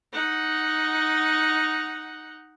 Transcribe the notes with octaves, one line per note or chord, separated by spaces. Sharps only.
D#4 F#5